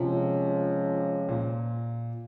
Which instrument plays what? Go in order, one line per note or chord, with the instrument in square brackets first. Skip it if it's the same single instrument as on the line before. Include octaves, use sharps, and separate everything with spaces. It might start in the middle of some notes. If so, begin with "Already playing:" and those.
Already playing: [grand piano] C3 [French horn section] F3 G#3 C#4 F4
[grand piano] A#2